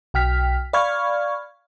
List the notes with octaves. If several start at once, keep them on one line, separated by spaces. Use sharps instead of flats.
B1 G5 F6 B6
D5 F5 B5 C#6 F6 G#6